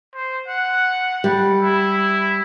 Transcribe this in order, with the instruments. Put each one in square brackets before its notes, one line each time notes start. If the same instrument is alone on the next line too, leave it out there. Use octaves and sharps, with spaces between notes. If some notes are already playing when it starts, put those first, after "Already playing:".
[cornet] C5
F#5
[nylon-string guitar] G3
[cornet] E4